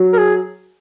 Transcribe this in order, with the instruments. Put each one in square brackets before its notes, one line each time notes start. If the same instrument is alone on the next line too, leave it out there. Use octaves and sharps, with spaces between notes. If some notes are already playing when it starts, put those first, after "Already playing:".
Already playing: [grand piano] F#3
[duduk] A#4
G#4